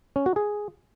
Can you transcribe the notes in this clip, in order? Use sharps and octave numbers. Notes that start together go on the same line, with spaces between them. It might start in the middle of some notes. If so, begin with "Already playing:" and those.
C#4
F#4
G#4